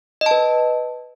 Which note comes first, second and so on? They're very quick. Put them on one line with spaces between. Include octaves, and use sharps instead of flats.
D#5 A5 B4